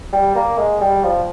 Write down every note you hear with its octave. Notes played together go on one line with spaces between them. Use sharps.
G3
A#3
G#3
G3
F3